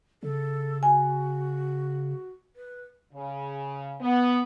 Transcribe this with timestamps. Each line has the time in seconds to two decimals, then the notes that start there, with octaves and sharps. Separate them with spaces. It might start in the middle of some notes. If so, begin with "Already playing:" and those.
0.23 C#3 A4
0.83 F#4 G#5
2.56 B4
3.14 C#3
4.01 B3